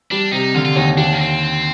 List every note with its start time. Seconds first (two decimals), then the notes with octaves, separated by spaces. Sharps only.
0.11 G3 D4
0.32 C3 D#4
0.54 D3 F4
0.65 F4
0.76 D#2 D#4
0.97 D#2 D4
1.13 A#3
1.20 C4